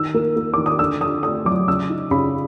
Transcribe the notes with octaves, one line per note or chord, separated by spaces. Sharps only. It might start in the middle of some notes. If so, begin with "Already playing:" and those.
Already playing: D#3 E6
A#3
A#3
D#3 D6
D#6
D3 E6
D3 D#6
A3 D#6
F#3 D6
C#3 E6
D#4
C#3 B5